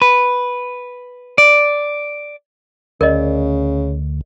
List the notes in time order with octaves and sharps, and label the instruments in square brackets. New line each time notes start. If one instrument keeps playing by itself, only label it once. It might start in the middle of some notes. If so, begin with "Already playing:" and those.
[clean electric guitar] B4
D5
[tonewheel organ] D2 [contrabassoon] C#3 [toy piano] A#4 D5 D#5